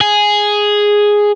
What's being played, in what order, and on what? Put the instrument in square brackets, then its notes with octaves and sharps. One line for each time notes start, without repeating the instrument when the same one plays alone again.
[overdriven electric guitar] G#4